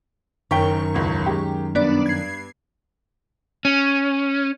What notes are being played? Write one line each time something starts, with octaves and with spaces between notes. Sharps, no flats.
F#1 F#2 D#3 G5 C#6 B6
E1 C#2
G#3 G4
G2 B3 D4 D5
G#6 C7
C#4